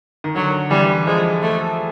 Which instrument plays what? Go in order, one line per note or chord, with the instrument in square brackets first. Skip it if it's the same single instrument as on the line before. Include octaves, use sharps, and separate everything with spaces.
[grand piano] D#3
[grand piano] D3 [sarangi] F#3
[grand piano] E3 [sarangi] G3
[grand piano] F3 [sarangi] G#3
[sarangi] A3